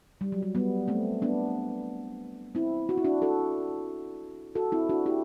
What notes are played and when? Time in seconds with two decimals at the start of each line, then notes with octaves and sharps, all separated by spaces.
0.21 G3
0.32 F#3
0.43 G3
0.55 G3 B3
0.88 A3 C4
1.22 B3 D4
2.55 C4 E4
2.89 F#4
2.98 E4
3.05 D4 F#4
3.22 F#4 A4
4.55 F#4 A4
4.72 C4 E4
4.89 D4 F#4
5.06 E4 G4